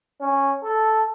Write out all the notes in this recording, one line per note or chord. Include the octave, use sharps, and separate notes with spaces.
C#4
A4